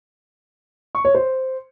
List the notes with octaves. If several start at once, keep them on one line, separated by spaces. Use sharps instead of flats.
C#6
C#5
C5